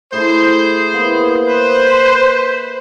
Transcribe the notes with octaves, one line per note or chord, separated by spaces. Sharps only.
A2 E4 G#4 A4 C5
A#3 B3 E4
B4 C5